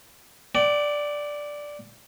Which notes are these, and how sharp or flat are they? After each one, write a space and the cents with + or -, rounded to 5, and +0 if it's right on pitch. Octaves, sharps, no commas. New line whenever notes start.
D5 +0 G5 -40